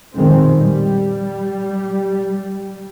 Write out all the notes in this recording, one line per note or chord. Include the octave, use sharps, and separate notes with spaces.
A#1 F2 B2 D#3 G#3 C4
G3